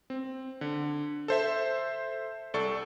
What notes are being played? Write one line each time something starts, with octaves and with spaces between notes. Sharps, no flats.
C4
D3
A4 C5 E5
C2 A4 D5 C#6